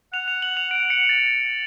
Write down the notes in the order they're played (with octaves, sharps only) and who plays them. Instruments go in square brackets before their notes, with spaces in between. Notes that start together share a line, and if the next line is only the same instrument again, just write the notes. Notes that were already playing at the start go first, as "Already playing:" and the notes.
[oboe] F#5 [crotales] F7
[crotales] F7
F#7
F7
D7
C#7
A6